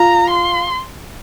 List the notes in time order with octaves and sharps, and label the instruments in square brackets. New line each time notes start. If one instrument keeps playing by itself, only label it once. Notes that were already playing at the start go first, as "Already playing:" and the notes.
Already playing: [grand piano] F4 [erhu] A#5
[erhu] C6